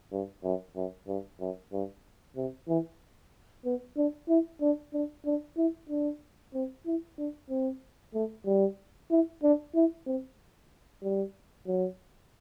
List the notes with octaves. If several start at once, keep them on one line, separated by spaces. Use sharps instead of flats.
G2
F#2
F#2
G2
F#2
G2
C3
E3
B3
D4
E4
D4
D4
D4
E4
D4
C4
E4
D4
C4
A3
G3
E4
D4
E4
C4
G3
F#3